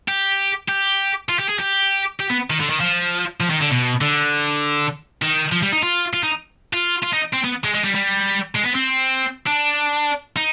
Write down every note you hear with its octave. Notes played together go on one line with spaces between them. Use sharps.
G4
G4
F4
G4
G#4
G4
G4
B3
D#3
D3
D#3
F3
F3
D#3
D3
B2
D3
D#3
F3
G3
D#4
F4
F4
D#4
F4
F4
D#4
C4
B3
G#3
G#3
G3
G3
G#3
B3
C4
D4
D#4